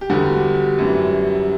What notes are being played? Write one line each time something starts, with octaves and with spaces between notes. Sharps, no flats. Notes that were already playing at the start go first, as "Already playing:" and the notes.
G4
E2 D3 G3 F#4
F#2 E3 G3